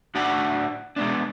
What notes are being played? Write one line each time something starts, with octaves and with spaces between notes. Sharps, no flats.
A2 D4 F#4 D5 F#5 A5
G#3 B3 D4